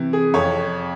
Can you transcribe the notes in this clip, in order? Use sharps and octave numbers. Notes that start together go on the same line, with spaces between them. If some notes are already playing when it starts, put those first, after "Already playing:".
Already playing: C3 E3
G#4
F2 C#5